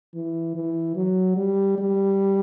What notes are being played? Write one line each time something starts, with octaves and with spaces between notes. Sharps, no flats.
E3
E3
F#3
G3
G3